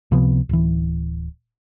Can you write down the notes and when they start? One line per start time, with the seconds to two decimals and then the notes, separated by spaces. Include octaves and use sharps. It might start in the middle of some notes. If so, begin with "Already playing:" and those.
0.11 C#2 C3 F3 B3
0.49 D1 E3